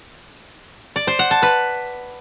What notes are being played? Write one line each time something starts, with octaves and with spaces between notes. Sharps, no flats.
D5
C5
F#5
A5
B4